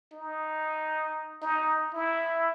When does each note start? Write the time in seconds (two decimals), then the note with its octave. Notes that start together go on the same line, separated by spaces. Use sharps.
0.13 D#4
1.42 D#4
1.94 E4